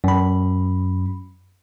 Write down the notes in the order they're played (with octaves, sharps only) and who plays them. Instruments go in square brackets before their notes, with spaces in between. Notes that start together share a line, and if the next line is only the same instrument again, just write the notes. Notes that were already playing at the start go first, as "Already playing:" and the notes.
[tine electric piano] F#2 B5